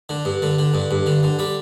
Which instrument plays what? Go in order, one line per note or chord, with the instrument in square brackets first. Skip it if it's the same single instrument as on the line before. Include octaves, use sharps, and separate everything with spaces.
[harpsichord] D3
G2
D3
D3
G2
G2
D3
D3
G3